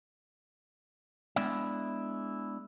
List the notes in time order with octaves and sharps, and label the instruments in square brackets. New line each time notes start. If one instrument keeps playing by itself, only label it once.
[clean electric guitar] G#3 B3 D4 E4 D5 E5